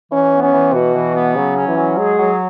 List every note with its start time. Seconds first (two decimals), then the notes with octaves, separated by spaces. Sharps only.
0.11 E3 C#4
0.32 B3
0.43 C#4
0.53 E3
0.73 B2 F#4
0.95 E3
1.16 B3
1.36 C#3 F#3
1.57 C#4
1.68 E3
1.77 F#3
1.98 G#3 G#4
2.19 F#3